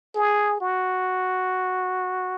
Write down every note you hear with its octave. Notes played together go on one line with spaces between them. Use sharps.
G#4
F#4